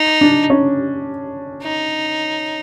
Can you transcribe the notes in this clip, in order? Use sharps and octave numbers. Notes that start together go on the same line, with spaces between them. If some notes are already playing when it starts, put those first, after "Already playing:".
Already playing: D#4
D4
C#4
D#4